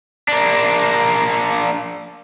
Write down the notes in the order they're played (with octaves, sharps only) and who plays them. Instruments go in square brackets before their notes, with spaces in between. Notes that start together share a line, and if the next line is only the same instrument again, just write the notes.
[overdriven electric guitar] A#3 D4